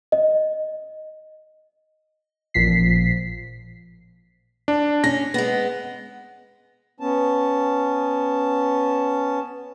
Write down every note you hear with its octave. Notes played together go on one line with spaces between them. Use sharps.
D#5
A1 A#2 F3 B6 C7
D4
C#4 A#6
G#3 B3
B3 C#4 A5